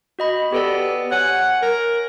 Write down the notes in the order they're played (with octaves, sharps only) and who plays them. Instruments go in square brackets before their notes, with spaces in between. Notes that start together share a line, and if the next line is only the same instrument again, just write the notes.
[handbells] F#4 D#5 B5
[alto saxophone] B3 [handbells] G4 A4 D5
[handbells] C#5 G#5 [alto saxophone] F#5
[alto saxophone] A#4